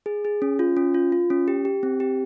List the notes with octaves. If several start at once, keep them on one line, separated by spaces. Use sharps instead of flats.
G#4
G#4
C#4
F4
C#4
F4
F4
C#4
G4
G4
C4
G4